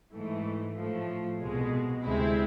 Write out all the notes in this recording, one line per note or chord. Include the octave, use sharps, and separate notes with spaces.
G#2 E3 A3
A2 F3 A3
C2 B2 G#3
D2 C3 G#3 C4 E4